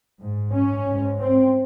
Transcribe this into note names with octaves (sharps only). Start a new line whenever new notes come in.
G#2
C#4
G#2
C4